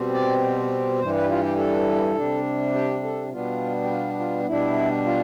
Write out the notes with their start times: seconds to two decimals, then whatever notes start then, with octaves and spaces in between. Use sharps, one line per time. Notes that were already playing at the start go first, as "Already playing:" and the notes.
Already playing: B2 G3 C4
0.14 D5
1.00 G2 E3 G3 C5
1.16 B4
1.30 F4
1.43 G4
1.58 A4
2.16 C3 G3 D4
2.74 G4
3.03 A4
3.32 B2 G3 B3 D4 F4
3.83 G4
3.89 F4
4.19 F4
4.47 B2 G3 D4 E4
5.06 F4